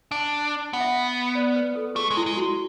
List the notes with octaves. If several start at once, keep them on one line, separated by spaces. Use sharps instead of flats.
D4
B3 F#5
E5
F#5
D5
B4
A4
A3 G#4
G#3
E4
G#3
F#4